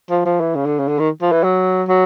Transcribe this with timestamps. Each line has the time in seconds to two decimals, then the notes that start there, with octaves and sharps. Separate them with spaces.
0.10 F3
0.25 F3
0.40 E3
0.55 C#3
0.66 D3
0.79 C#3
0.88 D3
0.99 D#3
1.22 F3
1.32 E3
1.43 F#3
1.88 F#3